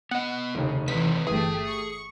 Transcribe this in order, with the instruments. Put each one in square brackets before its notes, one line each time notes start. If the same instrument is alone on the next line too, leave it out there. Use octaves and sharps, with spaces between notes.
[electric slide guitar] B3 D#5 [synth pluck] F#5
[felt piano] F1 D#2 [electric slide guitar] C#3
[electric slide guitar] D#3 C4 B4 [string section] E3 [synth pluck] B6
[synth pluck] G1 E3 [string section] A3 G4 [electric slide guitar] G#4 [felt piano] D#6
[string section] C#6